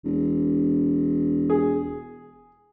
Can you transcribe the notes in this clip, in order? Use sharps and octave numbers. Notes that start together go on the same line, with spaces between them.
E1
G#4